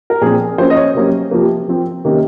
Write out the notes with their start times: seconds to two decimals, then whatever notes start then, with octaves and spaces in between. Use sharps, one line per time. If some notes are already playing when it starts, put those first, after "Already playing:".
0.10 A#4
0.21 A#2 F3 C4 G#4
0.58 F3 A#3 C#4 C5
0.70 D#5
0.76 C#5
0.94 C3 F#3 A#3 C#4
1.31 C3 F3 A#3
1.68 F3 C4
2.05 C3 D#3 A#3 C#4